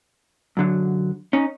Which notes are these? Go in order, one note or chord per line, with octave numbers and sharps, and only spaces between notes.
F#2 D3 F#3
C#4 D#4